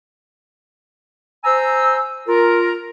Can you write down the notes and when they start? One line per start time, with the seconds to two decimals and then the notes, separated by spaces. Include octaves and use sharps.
1.44 C5 G#5 A#5 E6
2.27 F4 A#4